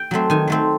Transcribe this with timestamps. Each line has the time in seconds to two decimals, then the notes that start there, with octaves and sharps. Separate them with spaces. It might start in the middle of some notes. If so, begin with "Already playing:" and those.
Already playing: G5
0.11 F#3 A3 C4
0.30 D#3 G#5
0.48 F#3 A3 C4